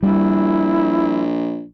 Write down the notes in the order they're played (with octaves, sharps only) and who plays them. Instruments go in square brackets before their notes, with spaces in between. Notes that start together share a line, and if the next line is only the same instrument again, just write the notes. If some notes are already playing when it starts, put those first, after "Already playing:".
[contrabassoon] A#1 [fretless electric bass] G3 [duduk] E4